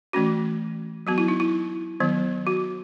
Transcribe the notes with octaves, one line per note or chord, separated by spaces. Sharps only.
E3 A3 C#4 F#4
F#3 B3 F#4
E4
D#4
E4
D#3 F#3 B3
F#4